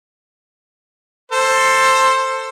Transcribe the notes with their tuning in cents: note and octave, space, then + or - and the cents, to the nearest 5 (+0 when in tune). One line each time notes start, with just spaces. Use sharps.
A4 +15 C5 +10